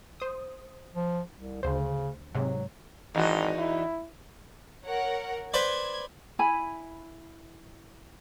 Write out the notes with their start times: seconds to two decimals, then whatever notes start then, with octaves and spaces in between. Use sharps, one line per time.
0.20 C5 D#6
0.94 F3
1.36 C2
1.63 D2 C#3 C5
2.35 G#2 C3 F#3
3.15 G#1 E2 D#4 F#4
3.58 E4
4.84 A#4 C#5 F#5
5.54 B4 C5 D5 G#6
6.39 E4 G#5 B5